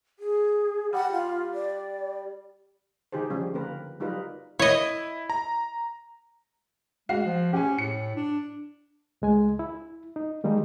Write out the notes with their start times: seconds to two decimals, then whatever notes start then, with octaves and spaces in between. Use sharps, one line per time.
0.19 G#4
0.93 G3 F#5
1.13 F4
1.54 D5
3.12 D3 D#3 D#4 G4 G#4 C5
3.30 C#3 F3 G3 C#4
3.54 D3 A#3 C4 A#4 B4
4.00 F#3 G3 D#4 F4 A#4 B4
4.59 E4 C#5 D#5
5.30 A#5
7.09 G#3 F#4 F5 C7
7.25 F3
7.53 C#4 G4 G#5
7.78 A2 C#7
8.16 D4
9.22 C#2 G#3 G#5
9.59 E4
10.16 D#4
10.44 D#3 G3 G#3 A#3 D#4